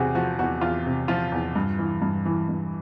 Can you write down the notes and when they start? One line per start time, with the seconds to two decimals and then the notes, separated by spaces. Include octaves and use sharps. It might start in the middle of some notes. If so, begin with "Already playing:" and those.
Already playing: E2 C3 F#4 G#4
0.15 F3 F#4
0.39 E2 F#4
0.61 E2 F4
0.86 C3
1.08 F3 F4
1.32 E2
1.55 G2
1.79 E3
2.02 G2
2.25 E3
2.48 G2